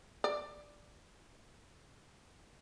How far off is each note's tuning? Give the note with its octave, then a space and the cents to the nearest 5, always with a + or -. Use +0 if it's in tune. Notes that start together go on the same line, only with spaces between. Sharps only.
D5 +5